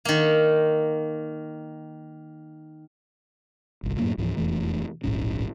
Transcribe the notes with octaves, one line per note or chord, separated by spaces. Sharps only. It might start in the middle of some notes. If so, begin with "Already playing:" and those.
D#3 A#3
G1 C2
F#2 A2 F#3 A#3
C#2 G#2 E3 F3
E1 F2 E3 A3
D1 A#1 G#2 C#4